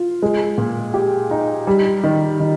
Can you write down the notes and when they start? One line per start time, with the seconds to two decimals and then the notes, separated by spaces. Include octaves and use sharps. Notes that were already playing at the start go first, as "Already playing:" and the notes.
Already playing: F4
0.22 G#3
0.58 A#2
0.94 G4
1.31 D#4
1.67 G3
2.04 D#3
2.40 D#3